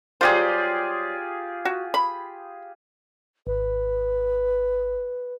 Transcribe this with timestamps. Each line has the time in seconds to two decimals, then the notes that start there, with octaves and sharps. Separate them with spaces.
0.21 F#3 G3 F4 G4 G#4 C5
1.65 F#4
1.94 B5
3.47 G#1 B4